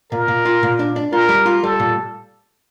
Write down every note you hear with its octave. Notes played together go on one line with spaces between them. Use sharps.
A#2 A#4
A#2
F4
A#2
D4
D4
F4 A#4
G3
F4
G3 A4
A#2